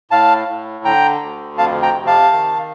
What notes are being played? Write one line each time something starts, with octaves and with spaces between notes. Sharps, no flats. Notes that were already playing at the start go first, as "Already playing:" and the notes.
A2 F5 A5
A2
D3 G5 A#5
D2
F2 F5 A5
G5 A#5
C3
F5 A5
D#3